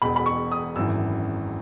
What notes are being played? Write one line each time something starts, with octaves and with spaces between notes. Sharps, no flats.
E1 E2 B2 B5
B5
C#6
D#6
G#1 F#2 E3 E6